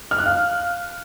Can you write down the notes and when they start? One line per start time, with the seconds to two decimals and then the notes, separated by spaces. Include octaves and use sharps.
0.11 F6
0.18 F#6
0.26 F5